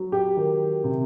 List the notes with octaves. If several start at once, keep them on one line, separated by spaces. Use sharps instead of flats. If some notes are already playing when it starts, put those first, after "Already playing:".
Already playing: F#3
G4
D#3
C3